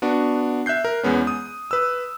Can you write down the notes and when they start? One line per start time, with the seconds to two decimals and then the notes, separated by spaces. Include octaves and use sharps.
0.02 B3 D4 F#4
0.66 E5 F#6 G6 C7
0.85 A#4
1.03 E2 G#3 B3 C#4
1.27 D#6
1.71 B4 E6